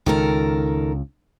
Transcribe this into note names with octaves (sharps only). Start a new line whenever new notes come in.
C#2 D#3 A4 A#4